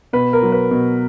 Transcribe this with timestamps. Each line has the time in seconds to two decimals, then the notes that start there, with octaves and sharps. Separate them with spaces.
0.13 B2 B4
0.33 A#4
0.43 F#3
0.52 B4
0.71 B2